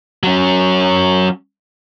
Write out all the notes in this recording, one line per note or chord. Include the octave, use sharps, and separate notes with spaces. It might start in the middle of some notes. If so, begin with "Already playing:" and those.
F#3 C#4